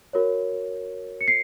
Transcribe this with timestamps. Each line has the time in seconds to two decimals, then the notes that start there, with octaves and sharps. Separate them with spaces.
0.13 F#4 A#4 C#5
1.21 C#7
1.28 C7